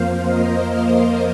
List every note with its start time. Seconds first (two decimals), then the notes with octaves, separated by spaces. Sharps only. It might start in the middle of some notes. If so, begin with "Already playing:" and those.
Already playing: F2 F3 A#3 C5 F5
0.23 A#4 D#5
0.78 A#4 D#5